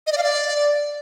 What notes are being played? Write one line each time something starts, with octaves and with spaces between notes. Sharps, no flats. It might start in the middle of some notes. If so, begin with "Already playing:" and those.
D#5
D5
F5
D5